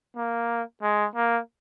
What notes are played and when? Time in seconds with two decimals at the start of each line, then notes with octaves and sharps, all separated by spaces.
0.16 A#3
0.82 G#3
1.16 A#3